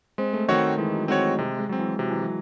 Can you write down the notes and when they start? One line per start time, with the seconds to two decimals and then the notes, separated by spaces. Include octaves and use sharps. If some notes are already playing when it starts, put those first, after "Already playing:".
0.18 G#3 C4
0.33 A3
0.48 D#3 C4 F#4 C#5
0.78 E3 G#3
0.94 F#3
1.08 G#3 C4 F#4 C#5
1.24 A3
1.38 C3 G#3
1.59 G#3
1.69 F#3 C4
1.79 E3
1.99 C3 F#3
2.10 E3
2.22 F#3